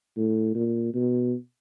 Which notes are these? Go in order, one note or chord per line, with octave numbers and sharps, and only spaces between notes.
A2
A#2
B2